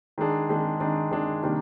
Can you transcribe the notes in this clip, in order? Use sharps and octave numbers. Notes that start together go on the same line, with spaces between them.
D#3 G#3 D4 G#4
D#3 G#3 D4 G#4
D#3 G#3 D4 G#4
D#3 G#3 D4 G#4
C3 D#3 G3 A#3 D4